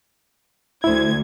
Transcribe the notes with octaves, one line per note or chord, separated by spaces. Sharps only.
D2 E4 C5 G#6